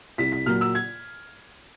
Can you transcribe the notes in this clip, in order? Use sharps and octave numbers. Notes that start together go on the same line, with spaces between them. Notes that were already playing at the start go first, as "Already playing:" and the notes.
C2 B6
B6
A#2 F#3 A#3 F6
E6
G#6